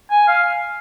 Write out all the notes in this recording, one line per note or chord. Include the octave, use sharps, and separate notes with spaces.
G#5
F5